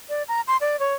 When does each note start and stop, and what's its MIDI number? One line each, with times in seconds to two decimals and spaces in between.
0.09 0.23 74
0.28 0.41 82
0.48 0.57 84
0.61 0.79 74
0.80 0.94 73